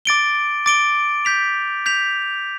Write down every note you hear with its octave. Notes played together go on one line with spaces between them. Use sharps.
D6 A6 D7 G7
D6 A6 D7 G7
G6 B6 F7
G6 B6 F7